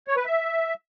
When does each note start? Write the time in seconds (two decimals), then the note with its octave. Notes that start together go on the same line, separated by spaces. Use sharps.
0.08 C#5
0.16 B4
0.25 E5